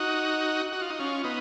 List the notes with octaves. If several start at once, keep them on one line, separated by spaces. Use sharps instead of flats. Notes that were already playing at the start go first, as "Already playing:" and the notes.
Already playing: D#4 F#4
F#4
F4
D#4
C#4 F4
B3 D#4